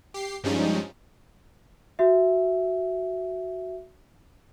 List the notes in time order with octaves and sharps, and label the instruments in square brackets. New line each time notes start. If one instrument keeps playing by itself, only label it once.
[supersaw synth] G4 C7
G2 F3 G3 G#3 C#4 D#4
[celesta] F#4 E5